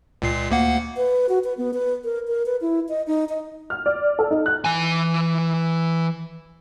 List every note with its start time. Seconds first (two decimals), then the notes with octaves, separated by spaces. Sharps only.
0.22 C#2 A#2 C7
0.50 D2 A#3 F#5
0.97 B4
1.29 F#4
1.44 B4
1.58 B3
1.74 B4
2.04 A#4
2.28 A#4
2.46 B4
2.61 E4
2.89 D#5
3.07 D#4
3.29 D#5
3.70 F6
3.86 D5
4.19 A4
4.31 D#4
4.46 F#6
4.65 E3 G#5